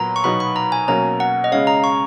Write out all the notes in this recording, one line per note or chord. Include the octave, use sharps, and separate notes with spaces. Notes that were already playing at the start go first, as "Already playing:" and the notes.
Already playing: A#2 F#3 B3 A#5
C#6
B2 F#3 B3 D#4 B5
B5
A#5
G#5
B2 F#3 A#3 C#4 A#5
F#5
D#5
C#3 G#3 C#4 F5
A#5
C#6